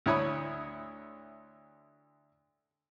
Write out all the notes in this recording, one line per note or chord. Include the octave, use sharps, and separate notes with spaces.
D2 E4 C#5 B5 D#6